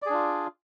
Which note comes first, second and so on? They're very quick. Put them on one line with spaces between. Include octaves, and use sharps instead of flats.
D5 G#4 D4 F4